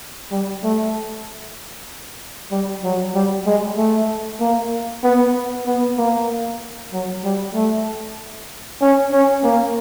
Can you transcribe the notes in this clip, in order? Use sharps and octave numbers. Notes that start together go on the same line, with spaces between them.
G3
A3
G3
F#3
G3
G#3
A3
A#3
B3
B3
A#3
F#3
G3
A3
C#4
C#4
A#3